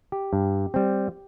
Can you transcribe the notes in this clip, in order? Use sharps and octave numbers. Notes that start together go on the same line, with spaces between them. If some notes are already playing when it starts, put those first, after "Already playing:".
G4
G2
G3 C4